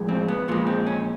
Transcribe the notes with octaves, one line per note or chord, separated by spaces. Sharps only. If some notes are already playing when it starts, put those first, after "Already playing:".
Already playing: A2 F3 G#3
C4
B3
A#2 F3 G#3 B3
C4
C#4